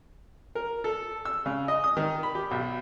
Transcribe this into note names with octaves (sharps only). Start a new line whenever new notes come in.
A#4
A4
E6
C#3
D#5
D#6
D#3
B5
G4
B1